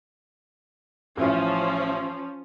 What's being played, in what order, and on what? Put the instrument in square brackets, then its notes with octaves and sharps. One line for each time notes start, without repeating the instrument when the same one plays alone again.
[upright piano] A1 E4 F4 [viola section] F3 C#4